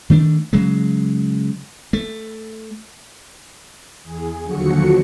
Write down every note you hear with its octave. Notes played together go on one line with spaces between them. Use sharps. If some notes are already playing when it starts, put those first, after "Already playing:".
D#3 A3 D4
C#3 F#3 G#3
A3
E2 G#4
D#2 D3 F3 F#3 F#4 C#7